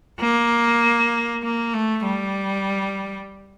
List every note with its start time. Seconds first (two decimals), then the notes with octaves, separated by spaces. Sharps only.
0.20 A#3
1.43 A#3
1.74 A3
2.05 G3